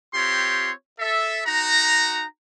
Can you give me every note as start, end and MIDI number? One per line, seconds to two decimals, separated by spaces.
0.14 0.70 60
0.14 0.70 65
0.14 0.70 67
0.14 0.70 73
0.14 0.70 84
1.00 1.41 69
1.00 1.41 76
1.46 2.24 63
1.46 2.24 66
1.46 2.24 82